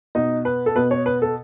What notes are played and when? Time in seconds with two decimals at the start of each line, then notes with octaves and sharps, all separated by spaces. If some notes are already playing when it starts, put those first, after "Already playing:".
0.15 B2 D#4
0.45 B4
0.66 A4
0.75 B2 B4
0.91 C#5
1.06 B4
1.22 A4